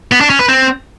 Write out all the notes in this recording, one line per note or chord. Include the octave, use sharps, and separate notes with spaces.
B3
D4
C#4
B4
C4